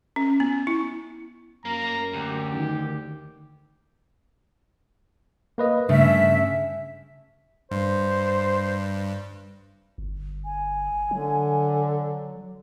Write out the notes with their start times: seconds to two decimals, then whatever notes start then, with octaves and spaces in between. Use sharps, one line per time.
0.16 C#4
0.40 B3
0.67 E4
1.65 F#2 A#3 A#5
2.13 D2 G4
2.54 D#3
5.58 A#3 B4 D#5
5.89 G2 C#3 A3 E5
7.71 G2 C5
9.98 G1
10.45 G#5
11.11 D3 F#3